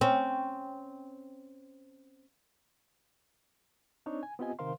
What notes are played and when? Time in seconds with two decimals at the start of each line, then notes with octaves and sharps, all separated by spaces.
0.01 C4 C#4
4.06 C4 D4 D#4 C#5
4.23 G#5
4.39 B3 C4 F4 G4 D#5 G#5
4.59 C3 D#3 A#4 C5 F5 C6